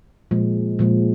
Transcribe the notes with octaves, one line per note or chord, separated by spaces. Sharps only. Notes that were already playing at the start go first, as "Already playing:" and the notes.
A#2 F3 G#3
A#2 F3 G#3